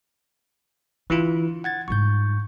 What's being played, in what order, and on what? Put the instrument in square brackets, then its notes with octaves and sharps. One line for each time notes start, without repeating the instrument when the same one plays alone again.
[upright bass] D3 [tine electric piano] E3 E4 F4
[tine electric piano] F#5 G#6 A6
[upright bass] G#2 G3 [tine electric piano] C#6 G6